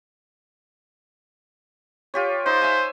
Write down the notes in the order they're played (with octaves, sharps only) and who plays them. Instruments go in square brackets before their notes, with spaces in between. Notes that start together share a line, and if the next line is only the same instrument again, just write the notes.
[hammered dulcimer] F4 G4 C#5
[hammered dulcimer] D#4 [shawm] C5
[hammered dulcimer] E5 G#5